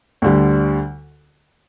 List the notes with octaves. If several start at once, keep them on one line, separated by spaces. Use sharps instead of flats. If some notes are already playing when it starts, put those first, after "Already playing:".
D2 D3 G3